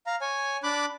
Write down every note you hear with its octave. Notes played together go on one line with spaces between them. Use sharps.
F5 A#5
C#5 G#5
D4 B5 D6 F#6